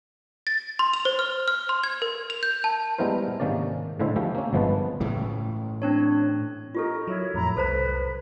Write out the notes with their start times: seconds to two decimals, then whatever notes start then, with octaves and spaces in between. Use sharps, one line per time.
0.47 A6
0.79 C6
0.93 F7
1.05 C5
1.19 F6
1.48 F6
1.69 C6
1.84 G#6
2.02 A#4
2.30 F7
2.43 G6
2.64 A5
2.98 G3 G#3 B3 E4 A#4 C5
3.40 G#2 C3 D#3 A#3 C#4 D5
4.00 A2 D3 G#3 E4 C5 E5
4.16 F3 A3 G4 A4
4.35 A#3 C#4
4.53 G1 F3 G#3 B3 B4 A5
5.00 A2 C#3 E3
5.82 C4 D4 C#5
6.75 D#4 F4 G4 A4 A#4
7.07 F#3 E4 C#5
7.34 F2 A2 A#5 B5
7.57 C2 A4 B4 C5 A#5